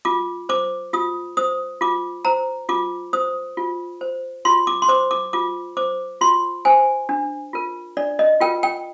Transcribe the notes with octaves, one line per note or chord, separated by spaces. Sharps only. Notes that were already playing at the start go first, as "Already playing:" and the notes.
F4 D6
C5 D6
F4 D#6
C5 D#6
F4 D6
C5 A#5
F4 D6
C5 D#6
F4
C5
F4 C6
D6
C6
C5 D6
D6
F4 D6
C5 D6
F4 C6
C5 G#5
D4
F4 A#4
D4 D5
D#5
F4 A#4 G5
G5